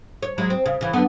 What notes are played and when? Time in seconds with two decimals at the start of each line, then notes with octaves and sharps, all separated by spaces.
0.23 C#5
0.38 F#3 G#3 E4
0.50 C4
0.66 C#3
0.81 C#3 E3
0.93 F#2 D3 B3